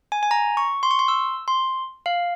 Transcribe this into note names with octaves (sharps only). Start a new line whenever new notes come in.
G#5
G#5
A#5
C#6
C6
C#6
C6
E6
C6
F5